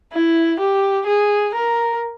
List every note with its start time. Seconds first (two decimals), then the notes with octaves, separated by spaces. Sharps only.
0.13 E4
0.59 G4
1.07 G#4
1.54 A#4